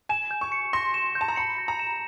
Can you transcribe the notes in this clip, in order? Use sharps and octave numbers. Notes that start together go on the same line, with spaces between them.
G#5 E7
G6
C#6
C#7
C6 A#6
E7
G6
A5
A#5
B5 C#7
A#6
A#5
E7